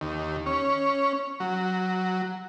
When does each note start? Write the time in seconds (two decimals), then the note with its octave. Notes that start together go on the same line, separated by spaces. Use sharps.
0.01 D#2
0.46 C#4
1.40 F#3